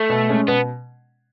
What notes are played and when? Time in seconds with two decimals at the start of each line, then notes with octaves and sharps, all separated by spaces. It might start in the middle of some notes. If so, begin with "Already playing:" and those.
Already playing: A3
0.10 B2
0.29 G#3 C#4
0.48 B2 B3